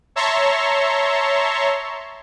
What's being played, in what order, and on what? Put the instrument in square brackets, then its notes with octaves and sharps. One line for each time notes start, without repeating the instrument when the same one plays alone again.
[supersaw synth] C#5 E5 A5 A#5 C6 C#6